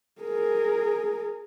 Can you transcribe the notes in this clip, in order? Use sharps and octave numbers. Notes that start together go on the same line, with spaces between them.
G#4 A#4